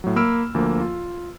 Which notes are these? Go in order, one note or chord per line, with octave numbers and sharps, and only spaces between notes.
A2 F#3
A#3 B5 E6 F6 D7
D2 F3 A#3
F4